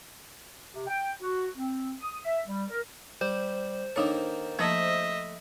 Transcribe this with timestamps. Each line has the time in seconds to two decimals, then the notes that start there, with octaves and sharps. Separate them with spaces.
0.73 C3
0.87 G5
1.21 F#4
1.56 C4
2.00 D#6
2.24 E5
2.47 G3
2.70 A#4
3.21 G3 C5
3.96 D#3 A#3 D4 D#4 A4 C#5
4.59 F3 A3 A#3 D#5 E5 A5 B5